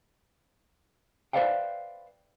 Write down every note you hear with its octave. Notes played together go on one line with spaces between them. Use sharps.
B4 C5 D5 E5 F5 G5